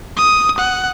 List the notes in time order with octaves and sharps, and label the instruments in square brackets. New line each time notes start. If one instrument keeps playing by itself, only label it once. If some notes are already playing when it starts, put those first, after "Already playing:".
[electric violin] D#6
F#5